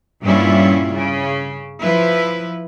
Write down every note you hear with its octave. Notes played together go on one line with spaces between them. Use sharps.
G2 A#2 G3 C#4 E4 F4
C#3
F3 E4 B4